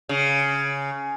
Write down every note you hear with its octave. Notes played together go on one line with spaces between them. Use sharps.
C#3